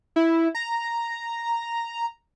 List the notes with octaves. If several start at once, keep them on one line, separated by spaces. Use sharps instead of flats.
E4
A#5